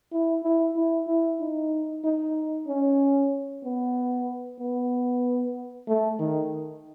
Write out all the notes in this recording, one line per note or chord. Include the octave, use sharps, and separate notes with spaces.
E4
E4
E4
E4
D#4
D#4
C#4
B3
B3
A3
D#3